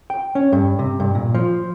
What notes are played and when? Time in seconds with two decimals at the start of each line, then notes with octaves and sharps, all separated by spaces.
0.10 G5
0.35 C#4
0.52 G2
0.79 C3
1.00 G2
1.15 A#2
1.34 F3